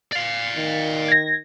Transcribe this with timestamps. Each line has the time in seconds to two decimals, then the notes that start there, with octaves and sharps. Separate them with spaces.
0.13 D5 F5
0.56 D#3
1.08 G#6 A#6